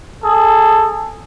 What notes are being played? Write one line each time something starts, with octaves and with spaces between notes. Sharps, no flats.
G#4 A4